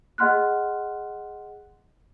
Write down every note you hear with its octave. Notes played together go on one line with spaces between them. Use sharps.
G#4 D#5 F#5 C6 F6 F#6